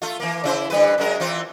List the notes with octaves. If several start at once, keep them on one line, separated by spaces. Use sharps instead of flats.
A3 F4
E3 A#3
C#3 E4 C5
D3 G3 B4
F#2 G#3 A#4
E3 C4 F4